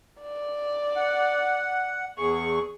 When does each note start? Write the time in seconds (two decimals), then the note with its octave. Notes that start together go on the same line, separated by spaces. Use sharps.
0.21 D5
0.96 F#5
2.18 E2 G#4 C#6